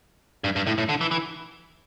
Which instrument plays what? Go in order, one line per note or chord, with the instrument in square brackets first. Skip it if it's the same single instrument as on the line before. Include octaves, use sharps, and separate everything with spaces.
[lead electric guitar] G2
G2
A2
A2
D3
E3
E3